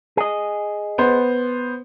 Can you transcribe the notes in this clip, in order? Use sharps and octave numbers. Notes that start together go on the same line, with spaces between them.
G#4 D#5
B3 C5